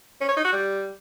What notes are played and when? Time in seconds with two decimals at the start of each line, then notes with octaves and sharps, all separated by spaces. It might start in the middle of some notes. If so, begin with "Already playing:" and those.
0.21 C#4
0.29 C#5
0.36 D#4
0.44 F#4
0.52 G3